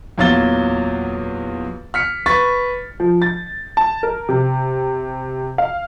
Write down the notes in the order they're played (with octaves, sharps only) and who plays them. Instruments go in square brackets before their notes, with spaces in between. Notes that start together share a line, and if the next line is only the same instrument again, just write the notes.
[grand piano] E2 A#2 F#3 F5 A6 G7
F6 B6 C#7
B4 C#6 A6 B6
[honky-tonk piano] F3
A6
A5
A#4
C3
F5